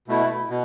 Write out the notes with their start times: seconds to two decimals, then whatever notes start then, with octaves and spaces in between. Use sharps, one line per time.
0.08 B2 A3 E4
0.50 B2